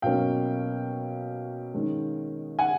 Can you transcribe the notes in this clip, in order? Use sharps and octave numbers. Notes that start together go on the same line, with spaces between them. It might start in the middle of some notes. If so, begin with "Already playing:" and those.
B2 F#3 A#3 C#4 F5 G5
D#3 G#3 C#4
F#5 G#5